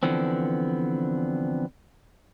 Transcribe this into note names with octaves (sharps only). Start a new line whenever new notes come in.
D3 E3 F3 B3 C4